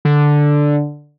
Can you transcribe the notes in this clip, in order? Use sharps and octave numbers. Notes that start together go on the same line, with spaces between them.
D3